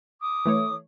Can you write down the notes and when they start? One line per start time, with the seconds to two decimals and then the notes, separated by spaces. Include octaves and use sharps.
0.21 D6 D#6
0.45 E3 A3 C#5